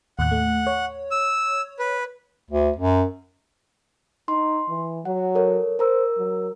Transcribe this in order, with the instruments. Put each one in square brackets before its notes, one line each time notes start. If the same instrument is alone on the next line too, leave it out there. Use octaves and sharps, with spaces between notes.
[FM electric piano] D#2 A2 F#6 [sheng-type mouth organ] F#5
[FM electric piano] A3
C#5
[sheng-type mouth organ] E6
B4
[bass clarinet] D2
F#2
[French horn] D#4 [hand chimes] C6
[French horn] E3
[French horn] F#3 [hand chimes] F#5
[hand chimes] A4 A#4 C#5
[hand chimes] A#4 A#5 E6 [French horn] C5
[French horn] F#3